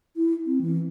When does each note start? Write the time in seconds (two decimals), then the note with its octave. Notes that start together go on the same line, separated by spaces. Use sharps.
0.16 E4
0.46 C4
0.61 E3